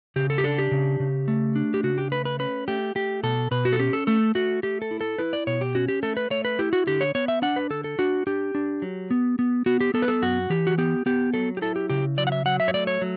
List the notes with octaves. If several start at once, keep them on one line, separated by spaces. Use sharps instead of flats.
C#3 G4
A4
G4
D4 A4
G4
C#3
C#3
A3
D4
G4
C#3 F#4
G4
A3 B4
B4
C#4 B4
A3 G4
A3 G4
B2 A4
B2 B4
F#4
A4
C#4 G4
A4
A3 A4
A3 F#4
A3 G4
A4
E4
A4
E4 B4
D5
B2 C#5
G4
C#4 F#4
G4
A3 A4
B4
A3 C#5
B4
E4 G4
F#4
D3 G4
C#5
B3 C#5
E5
D4 F#5
B4
D3 A4
A4
D4 F#4
D4 G4
D4
F#3
B3
B3
B3 F#4
G4
B3 A4
B4
A4
F#2 F#4
E3 G4
F#4
B3 G4
B3 G4
F#3 A4
G4
E4 A4
G4
C#3 G4
F#3 D5
F#5
E5
F#3 F#5
E5
C#5
A3 D5
C#5
F#3